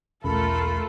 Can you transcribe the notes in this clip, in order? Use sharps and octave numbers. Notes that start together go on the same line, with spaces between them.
E1 B1 A3 C#4 F4 A4 A#4 B5